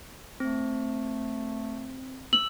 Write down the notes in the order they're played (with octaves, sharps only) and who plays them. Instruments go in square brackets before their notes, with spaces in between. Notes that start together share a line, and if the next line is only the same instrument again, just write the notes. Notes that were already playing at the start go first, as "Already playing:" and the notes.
[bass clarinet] A3 [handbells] C4
[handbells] E6 [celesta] F#7